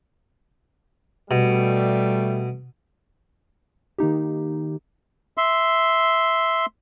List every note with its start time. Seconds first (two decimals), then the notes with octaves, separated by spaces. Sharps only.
1.31 B2 G3 A3
3.98 D#3 A#3 D#4 G4
5.37 E5 C6